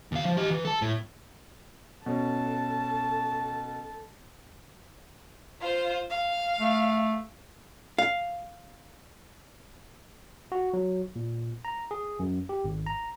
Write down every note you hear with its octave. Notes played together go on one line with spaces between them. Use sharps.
D#2 F5
F3
G4 D#5
E3
A4 A5
A2
B2 C#4 A4 A5
F4 C5
F5
A3
F5
F#4
F#3
A#2
A#5
G#4
F#2
G4
G#1
A#5